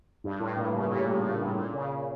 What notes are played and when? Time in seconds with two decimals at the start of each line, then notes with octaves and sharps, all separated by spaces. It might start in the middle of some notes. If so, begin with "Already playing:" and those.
0.24 G2
0.40 A2
0.57 A#2
0.74 C#3
0.90 A#2
1.08 A2
1.24 A2
1.41 A#2
1.58 A#2
1.74 C#3